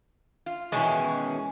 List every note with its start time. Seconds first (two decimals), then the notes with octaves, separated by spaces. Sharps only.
0.46 F4
0.72 B2 D#3 E3 G#3 C#4